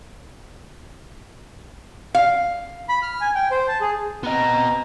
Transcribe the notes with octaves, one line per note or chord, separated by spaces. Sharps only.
F5
B5
F6
G#5
G5
C5
A5
G#4
B3 C4 D#5 A#5